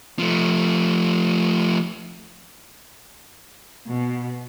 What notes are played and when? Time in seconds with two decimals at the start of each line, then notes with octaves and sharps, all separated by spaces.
0.19 F3 A3
3.88 B2